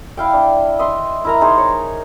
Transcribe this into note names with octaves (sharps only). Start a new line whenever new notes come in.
E4 F5 G5
D4
D#5 E5 C6
E4 A#4 A#5
D#4 G#4 C5
C#5